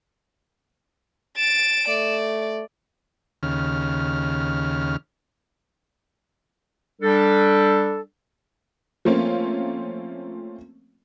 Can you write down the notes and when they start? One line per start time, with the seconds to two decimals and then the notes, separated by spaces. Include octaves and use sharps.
1.37 A6 D7 E7
1.88 A3 D5
3.43 D#2 C#3 F6
7.02 G3 D4 A4
9.05 F3 A3 A#3 C4 C#4 F4